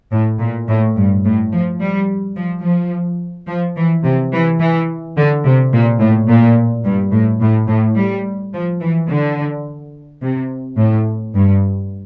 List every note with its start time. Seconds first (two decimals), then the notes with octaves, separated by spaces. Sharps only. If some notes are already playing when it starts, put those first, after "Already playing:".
0.12 A2
0.40 A#2
0.68 A2
0.97 G2
1.24 A2
1.52 F3
1.81 G3
2.37 F3
2.64 F3
3.48 F3
3.77 E3
4.05 C3
4.33 E3
4.60 E3
5.17 D3
5.45 C3
5.73 A#2
6.00 A2
6.29 A#2
6.86 G2
7.13 A2
7.42 A2
7.69 A2
7.97 G3
8.54 F3
8.82 E3
9.09 D3
10.22 C3
10.78 A2
11.34 G2